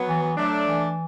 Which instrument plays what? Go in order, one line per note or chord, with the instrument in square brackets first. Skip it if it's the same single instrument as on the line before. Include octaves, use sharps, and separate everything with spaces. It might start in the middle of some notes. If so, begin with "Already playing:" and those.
Already playing: [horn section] F#3 B3
[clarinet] E3
E3
[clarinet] F#3 [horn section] A3 D4
[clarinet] E3